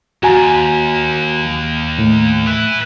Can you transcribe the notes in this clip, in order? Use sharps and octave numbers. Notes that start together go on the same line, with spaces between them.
D#2 F#4 G#5 A#5
A2
B4 E5